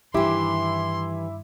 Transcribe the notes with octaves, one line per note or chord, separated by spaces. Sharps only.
G2 D#3 E3 E4 G4 E5 C6 D6